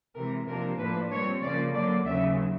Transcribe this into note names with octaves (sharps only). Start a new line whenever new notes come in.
C3 E3 G#3 A#4
C3 F3 A#3 D4 A#4
A2 F3 A#3 D4 B4
A#2 G3 C4 C#5
C#3 F3 A#3 D5
D3 F#3 A#3 D5
D#2 C#3 F#3 E5